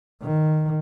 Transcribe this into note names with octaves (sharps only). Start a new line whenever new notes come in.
D#3